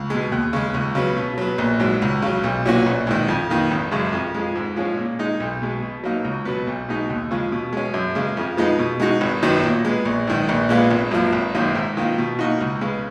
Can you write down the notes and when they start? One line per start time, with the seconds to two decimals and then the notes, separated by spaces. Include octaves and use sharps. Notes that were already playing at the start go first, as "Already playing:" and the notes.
Already playing: C#2
0.10 B2 G#3
0.32 D#2
0.53 C#3 G#3
0.74 C#2
0.95 C#3 F#3 B3
1.16 B2
1.38 F#3 B3
1.58 A#1
1.80 G#2 F#3
2.02 C#2
2.22 C#3 F#3
2.44 B1
2.65 A#2 F#3 C#4 F#4
2.86 A#1
3.07 G#2 D#3
3.28 F2
3.50 D#3 A#3
3.71 G#1
3.92 F#2 C#3 G#3
4.13 F2
4.34 F3 G#3
4.56 G#2
4.76 F3 G#3 C#4
4.97 A#2
5.19 G#3 D#4
5.40 B1
5.62 B2 G#3
5.82 B2
6.03 F#3 A#3 D#4
6.25 C#2
6.45 B2 F#3 B3
6.67 B1
6.88 B2 G#3 D#4
7.10 D#2
7.31 C#3 F3 G#3
7.52 B2
7.73 G#3 C#4
7.94 F#2
8.15 C#3 G#3
8.37 F2
8.57 F3 G#3 B3 D#4
8.79 B2
9.00 G#3 D#4 F#4
9.21 G#1
9.43 F#2 D#3 F#3 B3
9.63 A#2
9.85 G#3 B3
10.05 A#1
10.27 G#2 D#3
10.49 A#1
10.69 A#2 G#3 B3 F4
10.91 G#1
11.11 F#2 F3 A#3
11.33 G#1
11.55 F#2 D#3 F#3 A#3
11.75 G#2
11.97 D#3 A#3 F4
12.18 B2
12.39 A#3 D#4 F#4
12.61 C#2
12.81 C#3 G#3 B3